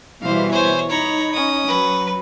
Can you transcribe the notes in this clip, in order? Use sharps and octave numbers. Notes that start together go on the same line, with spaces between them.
B2 E3 G3 C5 F5
C5 C#5 G#5
D#4 C#5 A#5 B5
C#4 D#6
F#3 B4